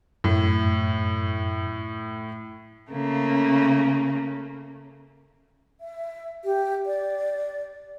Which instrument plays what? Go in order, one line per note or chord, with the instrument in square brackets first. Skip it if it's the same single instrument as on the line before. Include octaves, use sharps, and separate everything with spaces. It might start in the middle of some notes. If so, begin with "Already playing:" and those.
[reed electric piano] F#2 [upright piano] A2
[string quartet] C#3 A3 A#3
[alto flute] E5
G4
D5